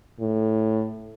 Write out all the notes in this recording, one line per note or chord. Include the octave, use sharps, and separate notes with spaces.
A2